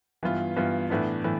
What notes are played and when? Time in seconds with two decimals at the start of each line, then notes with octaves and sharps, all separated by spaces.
0.23 G2 E3 B3 F4
0.56 G2 E3 B3 F4
0.90 A2 E3 B3 D4
1.24 A2 E3